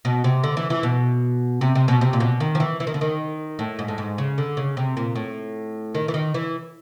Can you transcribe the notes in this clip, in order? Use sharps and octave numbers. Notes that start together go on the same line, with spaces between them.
B2
C3
D3
E3
E3
B2
C3
C3
B2
C3
A#2
B2
D#3
F3
E3
E3
D#3
D3
D#3
A2
G#2
A2
G#2
C#3
D3
C#3
C3
A#2
A2
D#3
E3
D#3
E3